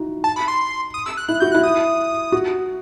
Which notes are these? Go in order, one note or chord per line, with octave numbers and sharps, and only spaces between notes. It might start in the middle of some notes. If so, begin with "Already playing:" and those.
Already playing: D#4 E4 F#4
A5
B5
C6
D#6
E6
F#6
E4 F#6
F#4 G6
E4 F#6
D#6
F#4